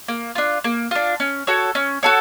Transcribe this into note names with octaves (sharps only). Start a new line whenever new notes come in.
A#3
D4 F4
A#3
D4 F4
C#4
F#4 A4 C#5
C#4
F#4 A4 C#5